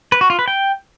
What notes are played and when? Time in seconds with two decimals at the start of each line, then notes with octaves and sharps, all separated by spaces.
0.12 B4
0.21 F#4
0.30 F4
0.39 B4
0.48 G5